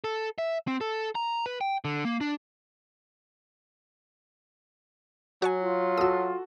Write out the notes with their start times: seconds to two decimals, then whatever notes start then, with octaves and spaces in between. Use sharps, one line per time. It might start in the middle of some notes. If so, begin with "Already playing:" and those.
0.04 A4
0.38 E5
0.68 C4
0.81 A4
1.15 A#5
1.46 B4
1.61 G5
1.85 D3
2.05 A#3
2.21 D4
5.42 F#3 F#4 C#5 G#5
5.60 F4
5.97 F#4 A4 D#6 E6